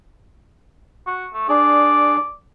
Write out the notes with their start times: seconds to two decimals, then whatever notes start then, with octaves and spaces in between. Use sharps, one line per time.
1.07 F#4
1.34 A3
1.48 D4 G#4 D5